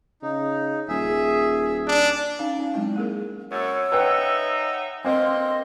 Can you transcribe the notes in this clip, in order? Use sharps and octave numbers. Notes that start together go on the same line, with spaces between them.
C#3 D#4
D#1 G#4 E5
D4
C#4 D#4 F5
C#4 F5
F#3 G#3 C4 E4
A#3 G#4 A#4
F#2 C#5 F#5 E6
D#4 B4 E5 G5
G2 A#3 C4 D#5 C6 E6